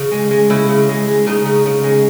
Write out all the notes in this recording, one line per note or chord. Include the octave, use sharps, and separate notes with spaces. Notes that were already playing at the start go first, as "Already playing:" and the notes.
Already playing: C#3
G#3
G#3
C#3 E4
C#3
G#3
G#3
C#3 D#4
C#3
C#3
G#3